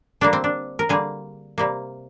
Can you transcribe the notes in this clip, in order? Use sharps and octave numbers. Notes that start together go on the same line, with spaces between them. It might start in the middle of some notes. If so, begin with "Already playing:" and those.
D3 G3 A#3 D4
C4
D4
A#4
D3 G3 A#3 G#4
C3 G3 A#3